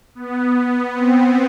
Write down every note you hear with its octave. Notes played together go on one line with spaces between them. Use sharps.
B3
C4